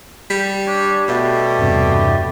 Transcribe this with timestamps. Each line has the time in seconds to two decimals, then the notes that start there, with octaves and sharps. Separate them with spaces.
0.30 G3
0.66 D4 C#5
1.08 B2 A3 G4 D5
1.58 E2 G2 C3